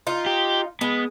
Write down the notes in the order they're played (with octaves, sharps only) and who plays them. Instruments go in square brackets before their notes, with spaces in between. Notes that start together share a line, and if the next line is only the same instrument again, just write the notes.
[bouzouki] D#4 F4
[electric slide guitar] G4
[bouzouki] G#3 [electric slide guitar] B3